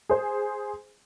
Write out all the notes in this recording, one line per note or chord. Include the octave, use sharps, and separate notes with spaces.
G#4 C5